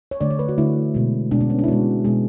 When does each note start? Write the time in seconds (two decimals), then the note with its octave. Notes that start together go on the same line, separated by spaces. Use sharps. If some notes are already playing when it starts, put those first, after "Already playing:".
0.11 C#5
0.21 D3 A3 D5
0.30 C#5
0.39 B4
0.49 F#4
0.58 D3 A3 E4
0.94 B2 G#3
1.31 B2 G#3 D4
1.41 B3
1.50 C#4
1.59 D4
1.64 E4
1.68 B2 G#3 F#4
2.04 B2 G#3 G#4